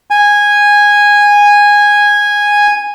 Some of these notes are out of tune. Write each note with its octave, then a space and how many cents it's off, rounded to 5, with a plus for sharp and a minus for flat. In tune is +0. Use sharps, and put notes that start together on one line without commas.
G#5 -10